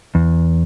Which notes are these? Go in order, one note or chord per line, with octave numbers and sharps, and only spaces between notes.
E2